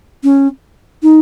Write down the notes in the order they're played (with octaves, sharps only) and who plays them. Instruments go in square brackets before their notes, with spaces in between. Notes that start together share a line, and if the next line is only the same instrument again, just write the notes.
[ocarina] C#4
D#4